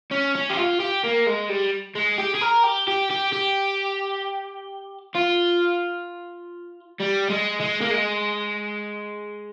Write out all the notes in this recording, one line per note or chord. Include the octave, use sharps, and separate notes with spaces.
C#4
C#4
G4
F4
G4
A#3
G#3
G3
G#3
G4
G#4
A#4
G4
G4
G4
G4
F4
G3
G#3
G#3
A#3
G#3